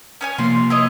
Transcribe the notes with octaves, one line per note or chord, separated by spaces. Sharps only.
C#4 C#5 G#5
C3 F3 A#3 C6
E4 C#5 D#5